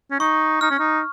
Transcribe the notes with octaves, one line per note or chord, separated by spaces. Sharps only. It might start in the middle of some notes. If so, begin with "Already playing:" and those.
C#4
D#4 C#6
D#4 F6
C#4
D#4